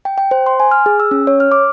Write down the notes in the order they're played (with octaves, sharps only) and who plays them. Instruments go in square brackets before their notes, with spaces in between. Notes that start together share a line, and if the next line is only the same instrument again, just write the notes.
[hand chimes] G5
G5
C5
C6
G#5
F6
G#4
E6
C#4
C#5
F6
D6